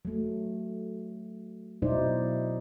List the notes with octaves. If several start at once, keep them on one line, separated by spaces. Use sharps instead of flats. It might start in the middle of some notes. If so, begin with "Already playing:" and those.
F#3 A3
B2 F#3 D#4 E4 C5 D5